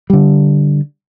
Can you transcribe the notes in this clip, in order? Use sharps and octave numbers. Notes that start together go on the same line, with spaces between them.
D3 G3